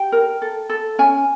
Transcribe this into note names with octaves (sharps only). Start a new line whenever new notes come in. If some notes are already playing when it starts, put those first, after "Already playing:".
Already playing: G4 G5
A#4
A4
A4
C#4 G#5